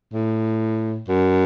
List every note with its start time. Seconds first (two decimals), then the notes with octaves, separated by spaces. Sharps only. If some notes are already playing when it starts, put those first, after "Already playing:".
0.13 A2
1.08 F#2